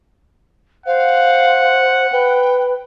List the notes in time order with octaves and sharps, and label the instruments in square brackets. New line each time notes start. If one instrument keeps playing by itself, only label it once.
[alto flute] C5 [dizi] F5 [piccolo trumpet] F#5
[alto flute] B4 [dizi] G5